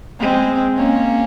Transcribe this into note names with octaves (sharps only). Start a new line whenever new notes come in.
G#3 C4
A#3 C#4